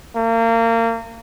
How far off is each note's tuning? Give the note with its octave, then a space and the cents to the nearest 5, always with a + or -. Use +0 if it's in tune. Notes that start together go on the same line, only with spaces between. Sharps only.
A#3 -30